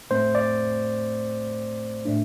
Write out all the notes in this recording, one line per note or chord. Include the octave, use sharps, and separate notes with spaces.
A2 A3 C4 C5
D5
A2 A3 D4